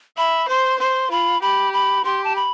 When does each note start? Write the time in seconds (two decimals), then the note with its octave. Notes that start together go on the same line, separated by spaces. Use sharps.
0.18 E5 B5
0.49 C5 C6
0.80 C5 C6
1.11 F4 B5
1.42 G4 B5
1.74 B5
2.05 G4 C6
2.24 A5
2.36 B5